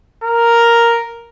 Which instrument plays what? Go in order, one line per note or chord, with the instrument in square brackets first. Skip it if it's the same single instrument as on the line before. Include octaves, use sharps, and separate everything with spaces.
[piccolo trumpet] A#4